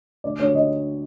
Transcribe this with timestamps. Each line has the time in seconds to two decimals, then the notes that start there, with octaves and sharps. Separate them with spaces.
0.24 D2 D5
0.40 D2 C#5
0.54 D3 D#5